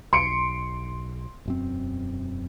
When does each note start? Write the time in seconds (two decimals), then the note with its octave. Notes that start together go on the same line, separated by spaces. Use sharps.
0.13 B1 C6 C#7 D7
1.46 E1 F#2 C4